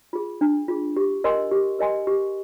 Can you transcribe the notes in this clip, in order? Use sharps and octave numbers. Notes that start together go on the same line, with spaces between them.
F4 G#4
D4
F4 G#4
G4
A#4 D#5 G#5 C6
G4
A#4 D#5 G#5 C6
G4